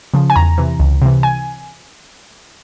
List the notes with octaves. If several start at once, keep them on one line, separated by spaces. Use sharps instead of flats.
C#3 F3
G#5
E2 A#5
C3 E3
C#2
C3 E3
G#5